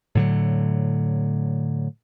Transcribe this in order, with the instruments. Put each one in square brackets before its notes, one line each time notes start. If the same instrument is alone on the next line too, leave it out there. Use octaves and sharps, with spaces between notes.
[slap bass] A2 D3 F#3